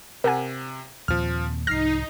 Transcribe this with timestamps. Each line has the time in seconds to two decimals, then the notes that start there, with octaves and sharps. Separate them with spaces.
0.24 C3 A#4 F#5 G#5
1.08 D#2 A#2 F3 C4 F6
1.67 C2 G#2 F3 D#4 F6 A#6 C7